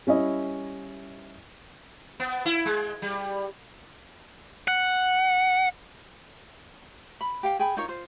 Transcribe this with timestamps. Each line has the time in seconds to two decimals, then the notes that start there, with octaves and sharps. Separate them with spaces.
0.07 G3 C#4 E4 D#5
2.20 B3
2.45 E4
2.65 G#3
3.02 G3
4.68 F#5
7.21 B5
7.43 G4 F5 G5
7.59 G#4 G5 G#5 B5
7.77 D#4 F4 A#4 C#5
7.88 F4 C5